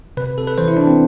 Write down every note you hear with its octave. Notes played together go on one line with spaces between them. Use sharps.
C3 B4
C3 A4
B4
E3 C5
E4
E3 D4
C4